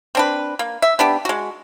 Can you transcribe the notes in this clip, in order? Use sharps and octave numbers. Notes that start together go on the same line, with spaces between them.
C4 D4 B4
A#3
E5
B3 D4 G4
G#3 F#4